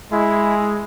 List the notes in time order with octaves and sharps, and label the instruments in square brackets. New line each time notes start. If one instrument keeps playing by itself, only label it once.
[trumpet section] G#3 [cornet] E4